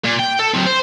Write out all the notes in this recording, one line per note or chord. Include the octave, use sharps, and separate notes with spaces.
A#2
G5
A4
F#3 C4
C5